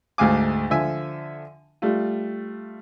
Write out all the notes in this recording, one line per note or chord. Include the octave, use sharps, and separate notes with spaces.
D2 G#2 A3 F5 G#5 D6
D3 F3 E5 G#5
G3 A3 F4